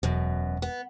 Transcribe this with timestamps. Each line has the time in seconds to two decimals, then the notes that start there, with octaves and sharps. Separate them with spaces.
0.03 E1 F#2 B2
0.62 B3